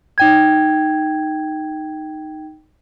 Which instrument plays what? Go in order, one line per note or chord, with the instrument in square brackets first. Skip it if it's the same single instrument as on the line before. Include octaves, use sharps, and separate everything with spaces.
[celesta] D#4 G5 G#6